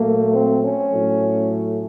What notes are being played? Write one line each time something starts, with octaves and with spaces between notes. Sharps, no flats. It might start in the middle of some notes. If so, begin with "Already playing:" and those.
Already playing: A#2 F#3 A3 A#3
C4
C#4
A2 F#3 A3